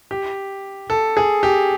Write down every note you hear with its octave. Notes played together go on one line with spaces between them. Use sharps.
G4
A4
G#4
G4